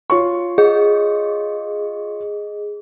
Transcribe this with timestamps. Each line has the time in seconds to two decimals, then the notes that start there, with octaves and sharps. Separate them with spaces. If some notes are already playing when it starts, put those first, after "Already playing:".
0.10 F4 C#5 C#6
0.58 G#4 D#5